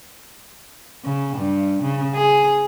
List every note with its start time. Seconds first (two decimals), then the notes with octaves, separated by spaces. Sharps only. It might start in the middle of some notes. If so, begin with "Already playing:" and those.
1.04 C#3
1.37 G2
1.83 C#3
2.15 G#4